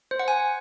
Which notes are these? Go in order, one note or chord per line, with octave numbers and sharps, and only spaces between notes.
C5
F#5
G#5